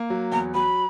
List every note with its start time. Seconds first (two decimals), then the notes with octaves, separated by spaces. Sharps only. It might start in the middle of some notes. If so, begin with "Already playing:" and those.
Already playing: A#3
0.10 F#3
0.32 E2 A#5
0.54 F#3 B5